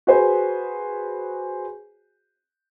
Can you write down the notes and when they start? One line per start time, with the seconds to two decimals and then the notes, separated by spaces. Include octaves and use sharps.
0.07 F#4 G#4 B4 C5 G#5